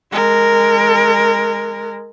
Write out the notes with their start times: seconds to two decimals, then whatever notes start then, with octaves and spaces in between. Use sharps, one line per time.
0.12 G#3 A#4